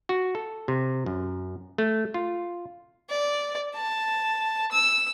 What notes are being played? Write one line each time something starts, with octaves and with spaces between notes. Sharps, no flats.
F#4
A4
C3
F#2
A3
F4
D5
A5
E6